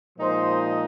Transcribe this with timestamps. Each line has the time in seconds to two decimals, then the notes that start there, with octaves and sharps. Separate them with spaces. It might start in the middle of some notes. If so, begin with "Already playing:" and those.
0.19 A#2 F3 G#3 D#4 C5